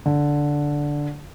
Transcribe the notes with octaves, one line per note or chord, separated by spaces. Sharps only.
D3